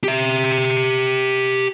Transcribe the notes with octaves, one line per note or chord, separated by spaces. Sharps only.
G4 E5